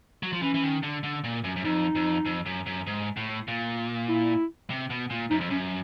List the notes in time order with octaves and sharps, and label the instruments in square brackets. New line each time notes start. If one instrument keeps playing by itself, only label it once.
[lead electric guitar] F#3
F3
[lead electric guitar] E3 [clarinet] C#4
[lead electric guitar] E3
D#3
D3
D3
A#2
F#2
F#2
[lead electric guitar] F2 [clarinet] D#4
[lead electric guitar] F2
F2
F#2
F#2
G#2
A2
A#2
[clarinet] E4
[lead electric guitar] C3
B2
A#2
[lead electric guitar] F#2 [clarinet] D#4
[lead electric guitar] F2
[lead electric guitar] F#2 [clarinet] C#4